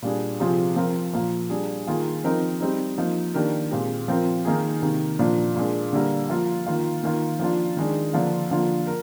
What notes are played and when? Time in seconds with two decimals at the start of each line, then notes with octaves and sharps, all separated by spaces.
0.02 A#2 G3 D4 G#4
0.40 C3 F3 C4 F4 G#4
0.76 F3 C4 F4 A#4
1.13 A#2 F3 A#3
1.50 G3 D4 G#4
1.87 D#3 A#3 F4 G#4
2.24 F3 C4 D#4 A#4
2.61 G3 C4 D#4
2.98 F3 A#3 D#4
3.34 D#3 A#3 D4 G4 A#4
3.71 A#2 G#3 C4 G4
4.08 F3 C4 F4 A#4
4.45 D#3 A#3 D#4 G#4
4.82 C3 D#3 A#3
5.19 A#2 F3 A#3 D4
5.56 A#2 G#3 D4
5.93 D3 G3 A#3
6.29 F3 A#3 F4
6.67 D#3 A#3 F4
7.03 D#3 A#3 F4
7.39 F3 A#3 D4 F4
7.77 D#3 G#3 D4
8.13 D3 F3 A#3 D4 F4
8.51 D3 F3 A#3 F4
8.87 A#4